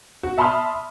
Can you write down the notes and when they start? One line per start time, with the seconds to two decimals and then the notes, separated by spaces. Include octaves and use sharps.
0.23 F#4
0.38 E5 A5 B5 C6 D#6 F6